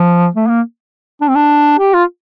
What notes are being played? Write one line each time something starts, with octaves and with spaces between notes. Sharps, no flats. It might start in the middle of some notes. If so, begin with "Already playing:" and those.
Already playing: F3
A3
A#3
D4
C4
D4
G4
F4